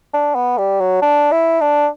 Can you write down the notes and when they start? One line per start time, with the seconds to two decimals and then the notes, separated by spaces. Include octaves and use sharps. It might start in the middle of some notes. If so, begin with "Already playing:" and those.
0.13 D4
0.35 B3
0.58 G3
0.80 F#3
1.02 D4
1.32 E4
1.61 D4